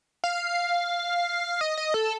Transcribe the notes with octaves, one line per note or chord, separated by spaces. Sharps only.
F5
D#5
D#5
A4